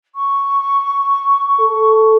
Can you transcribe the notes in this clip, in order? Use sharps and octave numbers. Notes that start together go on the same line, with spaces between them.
C#6
A4